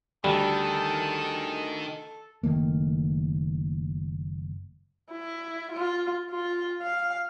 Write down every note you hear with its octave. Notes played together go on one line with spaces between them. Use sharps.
D2 D#3 G3 A4
F#1 D#3 A3 A#3
E4
F4
F4
F5